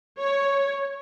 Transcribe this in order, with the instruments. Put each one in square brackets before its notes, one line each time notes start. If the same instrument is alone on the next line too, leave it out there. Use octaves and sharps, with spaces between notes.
[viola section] C#5